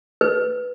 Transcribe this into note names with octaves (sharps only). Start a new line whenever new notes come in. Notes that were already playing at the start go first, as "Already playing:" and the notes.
B4